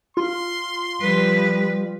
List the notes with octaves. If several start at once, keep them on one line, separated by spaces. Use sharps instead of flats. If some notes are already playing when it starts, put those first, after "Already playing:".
F4 C6
F3 G3 B4